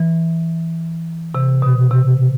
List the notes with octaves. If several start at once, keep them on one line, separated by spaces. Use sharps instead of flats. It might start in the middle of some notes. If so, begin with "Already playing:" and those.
Already playing: E3
C3
B2
C3